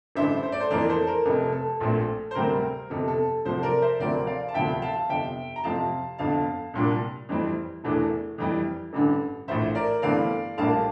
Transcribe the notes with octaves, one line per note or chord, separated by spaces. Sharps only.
A1 G2 D3 C5 E5
C5
D5
A4 C5
F2 E3 A#3 A#4 D5
A4 C5
A#4
F1 F2 C3 A4
A4
A#1 A#2 A3 C4
C5
D2 C3 G3 C4 A#4
G1 F2 C3 A4
A4
C2 C3 F3 A4 C5
A#4 D5
C5 E5
D2 C3 F3 C4 A#4 D5
D5 F5
A5
E1 D2 C3 F3 E5 G5
F5 A5
G1 F2 C3 E5 G5
A#5
F2 C3 F3 C4 F5 A5
G1 F2 D3 F5 A5
C2 A#2 G3 D4
F2 E3 G3 C4
E1 E2 E3 A3 D4
F2 E3 G3
A1 G2 D3
A#1 A2 E3 C5 E5
A#4 D5
G1 G2 E3 A3 C4 D5 F5
A#1 A2 G3 A#3 D4 F5 A5